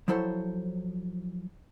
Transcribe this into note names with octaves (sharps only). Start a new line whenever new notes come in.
F3 F#3 E4 A4 C5 C#5